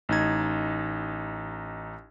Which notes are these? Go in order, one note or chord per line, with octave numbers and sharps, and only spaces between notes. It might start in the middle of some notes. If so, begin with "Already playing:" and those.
A1 D#4 G#6